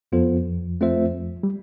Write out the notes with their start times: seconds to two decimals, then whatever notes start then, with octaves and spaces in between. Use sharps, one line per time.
0.12 F2 F3 B3 F4 A4 C5
0.81 A3 C4 F4 C5 E5
1.43 G3